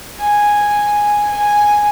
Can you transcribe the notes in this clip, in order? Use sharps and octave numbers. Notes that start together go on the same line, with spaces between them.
G#5
G#5